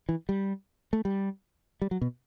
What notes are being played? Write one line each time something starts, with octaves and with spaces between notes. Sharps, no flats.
E3
G3
A3
G3
G3
F#3
B2